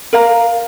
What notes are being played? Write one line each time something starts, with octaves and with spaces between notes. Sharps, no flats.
A#4 F5 A#5